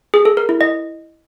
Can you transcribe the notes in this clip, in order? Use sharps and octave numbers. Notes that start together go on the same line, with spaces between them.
G#4
A4
A#4
E4
D#5